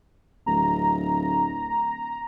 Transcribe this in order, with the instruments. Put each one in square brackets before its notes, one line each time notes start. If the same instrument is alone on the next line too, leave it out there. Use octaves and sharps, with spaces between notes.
[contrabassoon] D1 [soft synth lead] A#5